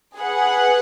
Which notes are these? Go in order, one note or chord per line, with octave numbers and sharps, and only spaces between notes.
G#4 B4 F#5